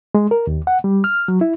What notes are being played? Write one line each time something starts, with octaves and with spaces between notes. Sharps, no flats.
G#3
A#4
D#2
F#5
G3
F6
F#3
E4